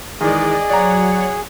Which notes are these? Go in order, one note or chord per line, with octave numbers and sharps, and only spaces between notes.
D#3 E3 G#3 G#4 D5 D#5
F#3 C#5 D5 F#5 A#5